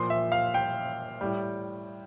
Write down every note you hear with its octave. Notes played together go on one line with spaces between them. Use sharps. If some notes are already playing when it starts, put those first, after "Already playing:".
Already playing: A#2 F3 C6
E5
F5
G5
A2 G3